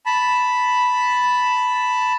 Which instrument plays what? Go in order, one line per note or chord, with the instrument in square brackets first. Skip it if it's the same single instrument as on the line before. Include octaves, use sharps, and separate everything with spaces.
[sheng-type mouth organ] A5 B5